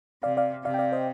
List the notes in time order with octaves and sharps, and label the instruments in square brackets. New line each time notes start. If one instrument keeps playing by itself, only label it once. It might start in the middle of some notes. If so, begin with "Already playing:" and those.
[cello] C3 [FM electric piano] D5 F5
[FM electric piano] D5 F5
[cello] C3 [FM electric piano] D5 F5
[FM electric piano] G5
D5 F5
C5 D#5